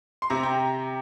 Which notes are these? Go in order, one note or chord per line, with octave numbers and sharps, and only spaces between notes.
C6
C3 A#5
G5